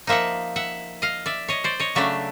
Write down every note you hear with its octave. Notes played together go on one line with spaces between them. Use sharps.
F3 A#3 D#4 E5 F#5
E5 F#5
D#5 F5
D5 E5
C#5 D#5
C5 D5
C#5 D#5
C#3 F#3 A3 D4 D5 E5